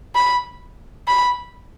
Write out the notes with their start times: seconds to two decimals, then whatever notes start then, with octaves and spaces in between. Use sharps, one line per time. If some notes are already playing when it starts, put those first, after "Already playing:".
0.15 B5
1.08 B5